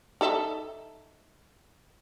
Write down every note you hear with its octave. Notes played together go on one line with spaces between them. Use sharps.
D#4 A4 E5